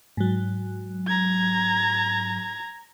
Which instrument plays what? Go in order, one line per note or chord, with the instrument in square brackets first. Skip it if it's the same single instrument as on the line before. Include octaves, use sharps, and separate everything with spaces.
[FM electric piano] G#2 F#3
[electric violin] A#5 G#6